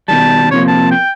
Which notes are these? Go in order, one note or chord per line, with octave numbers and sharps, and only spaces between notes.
B2 D#3 G3 A5
C3 F3 A#3 C#5
A5
G5